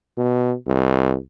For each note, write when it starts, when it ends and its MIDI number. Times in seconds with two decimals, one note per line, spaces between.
0.18 0.55 47
0.67 1.17 36